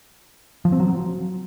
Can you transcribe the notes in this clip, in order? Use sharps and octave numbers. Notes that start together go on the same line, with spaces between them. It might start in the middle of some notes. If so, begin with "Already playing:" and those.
F3
C4
F#3